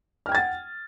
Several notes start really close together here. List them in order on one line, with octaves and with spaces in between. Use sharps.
F6 G5 G#6 A6 F#5